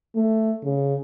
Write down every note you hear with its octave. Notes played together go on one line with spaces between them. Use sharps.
A3
C#3